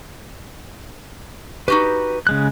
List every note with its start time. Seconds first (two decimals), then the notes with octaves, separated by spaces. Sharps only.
1.68 D#4 F#4 G4 B4
2.27 C#3 G#3 F#6